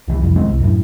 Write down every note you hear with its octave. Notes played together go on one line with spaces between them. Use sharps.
C#2 D#3 E3
F1 C2 F2
G1 D#2 G#3 C4
C2
F#2 A2